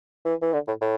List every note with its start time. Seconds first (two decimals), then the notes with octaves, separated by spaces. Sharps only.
0.25 E3
0.42 E3
0.53 D3
0.67 A2
0.82 A2